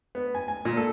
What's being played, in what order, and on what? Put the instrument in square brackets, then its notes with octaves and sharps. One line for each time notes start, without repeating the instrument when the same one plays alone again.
[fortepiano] B3
G#5
G#5
A#2
A4